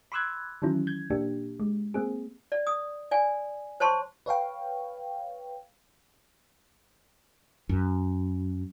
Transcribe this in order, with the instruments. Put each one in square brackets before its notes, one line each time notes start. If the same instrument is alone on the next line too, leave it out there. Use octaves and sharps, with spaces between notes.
[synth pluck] B5 C6 D6 E6 F#6 G#6
D#3 E3 F#3 C#4 E4
G6 G#6
A#2 A#3 D4 G4
G#3
A#3 C4 G#4
[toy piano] D5
D#6
D5 G#5
C5 C#5 A5 C6 C#6
[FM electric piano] B4 C#5 F5 G5
[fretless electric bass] F#2